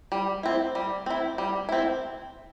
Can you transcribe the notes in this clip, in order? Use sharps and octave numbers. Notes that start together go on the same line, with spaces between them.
G3
C4 E4
G3
C4 E4
G3
C4 E4